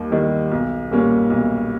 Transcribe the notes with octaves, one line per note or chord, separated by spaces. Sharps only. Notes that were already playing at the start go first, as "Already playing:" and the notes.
Already playing: D#2 D#3 G3
D#3 G3
B1
A#2 G3 A#3 C#4
B1